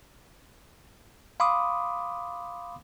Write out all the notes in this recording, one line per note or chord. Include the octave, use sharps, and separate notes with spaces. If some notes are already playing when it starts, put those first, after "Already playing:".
F5 B5 C6 D6 D#6